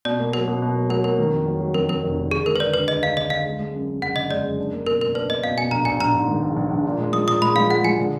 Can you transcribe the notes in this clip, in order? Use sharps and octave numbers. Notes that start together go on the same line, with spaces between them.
B2 D5
A#3
F#3 A#4
B2
B2
F#3
F#3 A#4
A#3 A#4
D#3
F2
F#3
F#3
F2 A#4
F2 A#4
F1
D#3
D3 G#4
G#3 A#4
B4
D3 D5
D2 B4
D2 D#5
D4 F5
D3 D#5
D3 F5
G#3
G#3
F#2
F#2
F#1 F#5
D3 D#5
G#3 D5
F#1
D4
A#3
B2 A#4
A#3 A#4
D4 B4
A#3 D#5
B2 F5
B2 G#5
A#1 A#5
A#1 G#5
A#1 A#5
G#2
D#3
A#1
A#1
A#1
A#2
G#3
F3 D#6
A#2 D#6
G#3 B5
F3 F5
G#3 F#5
F3 G#5
D3